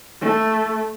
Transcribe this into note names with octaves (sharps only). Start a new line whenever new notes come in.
A3